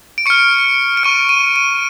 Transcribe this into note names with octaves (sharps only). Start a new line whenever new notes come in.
D7
C#6 F6 C#7
D7
C#6 F6 D#7
D#7
D#7